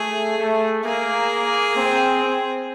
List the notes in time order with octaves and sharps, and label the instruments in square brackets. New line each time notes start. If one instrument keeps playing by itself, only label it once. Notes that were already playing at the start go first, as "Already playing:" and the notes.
Already playing: [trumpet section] A3 [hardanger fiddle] G#4
[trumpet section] A3
[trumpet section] A#3 [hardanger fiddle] G#4
[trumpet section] C4
C4